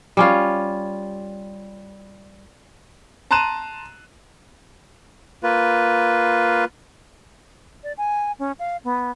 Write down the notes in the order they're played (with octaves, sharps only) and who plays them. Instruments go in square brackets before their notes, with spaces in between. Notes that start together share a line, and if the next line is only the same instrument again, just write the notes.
[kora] G3 C#4 F4
[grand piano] A5 A#5 C6 F#6 D#7 E7
[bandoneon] A#3 F4 B4
[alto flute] D5
G#5
C#4
F5
B3